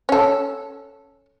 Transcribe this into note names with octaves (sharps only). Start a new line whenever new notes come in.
C#4 A4